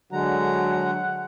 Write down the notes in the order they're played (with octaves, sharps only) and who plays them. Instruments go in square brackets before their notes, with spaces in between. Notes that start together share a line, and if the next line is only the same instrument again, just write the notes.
[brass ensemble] D3 F#3 [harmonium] G#3 A#5 [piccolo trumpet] F#5